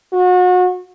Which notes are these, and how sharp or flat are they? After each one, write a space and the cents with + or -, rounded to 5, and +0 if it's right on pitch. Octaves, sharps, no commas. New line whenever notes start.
F#4 -30